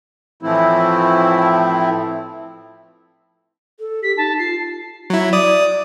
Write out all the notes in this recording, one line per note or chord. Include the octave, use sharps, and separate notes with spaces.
A2 E3 F3 A3 C4 E4
A4
G4 B6
D#4 A5
F4 C7
F#3 E4
D5 D#6